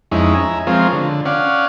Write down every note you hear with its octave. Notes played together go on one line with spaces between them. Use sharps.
F2 G#3 C#4 D#4 E4
E5 G#5 A#5
F3 G#3 C4 F4 A#4 C#5
D3
C#4 D5 F5 F#5